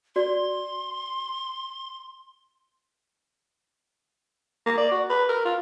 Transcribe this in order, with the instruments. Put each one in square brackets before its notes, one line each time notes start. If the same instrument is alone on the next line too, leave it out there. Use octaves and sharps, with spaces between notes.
[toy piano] F#4 D5 [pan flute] C6
[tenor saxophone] A#3
D5
F#4
B4
A#4
F4